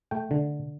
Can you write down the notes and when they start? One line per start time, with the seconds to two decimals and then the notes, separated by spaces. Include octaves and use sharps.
0.11 A3 G5
0.31 D3